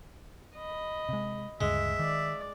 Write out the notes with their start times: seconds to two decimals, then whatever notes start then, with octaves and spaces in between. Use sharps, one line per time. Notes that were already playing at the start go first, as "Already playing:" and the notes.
0.55 D#5 B5
1.09 C3 G#3
1.61 D2 G2 C#3 G#3 E5
1.99 D#3 D5